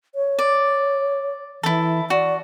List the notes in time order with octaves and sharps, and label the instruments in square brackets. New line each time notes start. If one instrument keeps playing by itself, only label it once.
[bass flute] C#5
[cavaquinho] D5
[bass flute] E3 [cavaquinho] E4 A4
[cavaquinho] F#4 [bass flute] D5